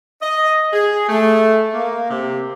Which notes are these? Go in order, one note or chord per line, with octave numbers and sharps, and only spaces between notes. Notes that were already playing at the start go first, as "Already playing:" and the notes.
D#5
G#4
A3
A#3
C3